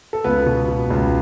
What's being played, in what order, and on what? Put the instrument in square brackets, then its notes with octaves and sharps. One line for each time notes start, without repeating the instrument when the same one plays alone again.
[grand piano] A4
C#2 B3 B4
B2
B2
C#2